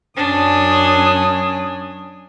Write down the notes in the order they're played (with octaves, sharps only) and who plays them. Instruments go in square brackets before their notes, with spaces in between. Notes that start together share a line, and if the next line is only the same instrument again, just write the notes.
[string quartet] F#2 C#4 D#6 [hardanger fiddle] D4